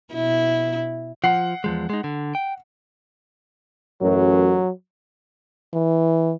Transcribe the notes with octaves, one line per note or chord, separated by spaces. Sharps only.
B2 E4
F3 F#5 C7
E2 F3 G#3
G#3 D#4
D3
G5
A1 F#2 F#3
E3